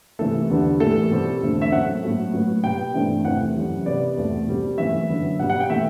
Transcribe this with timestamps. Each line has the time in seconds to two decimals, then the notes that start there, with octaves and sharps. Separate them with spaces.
0.19 C3 E3 A3 A4
0.50 E2 D3 G3 B3
0.80 A2 E3 G3 A4
1.11 B2 G3 C4
1.41 E2 D3 A3 C4
1.62 E5
1.72 A2 F#3 A3 C4 F#5
2.03 A2 F#3 A3
2.34 A2 F#3 B3
2.64 B2 G3 B3 G5
2.94 G2 E3 A3 C4
3.25 E2 C3 E3 A3 C4 F#5
3.56 F#2 E3 G3
3.86 C3 G3 B3 D5
4.17 E2 B2 A3 C4
4.47 B2 G3 C4
4.78 F#2 E3 A3 E5
5.09 F#2 D3 F#3 B3
5.39 B2 G3 B3 F#5
5.50 F#5
5.60 G5
5.70 E3 A3 E5